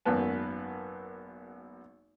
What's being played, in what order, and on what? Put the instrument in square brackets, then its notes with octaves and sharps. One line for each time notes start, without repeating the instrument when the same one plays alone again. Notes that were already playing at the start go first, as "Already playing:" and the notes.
[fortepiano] G#1 F#2 A#3 B3 B4 A5